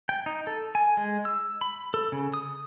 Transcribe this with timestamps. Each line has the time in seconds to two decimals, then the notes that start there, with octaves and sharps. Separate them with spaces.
0.09 G5
0.26 D#4
0.47 A4
0.75 G#5
0.97 G#3
1.25 E6
1.61 B5
1.94 A4
2.12 C#3
2.34 D#6